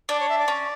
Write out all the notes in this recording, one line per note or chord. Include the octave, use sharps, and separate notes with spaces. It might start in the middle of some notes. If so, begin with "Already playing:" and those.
D4 D5
C#5
E5
D5
C#4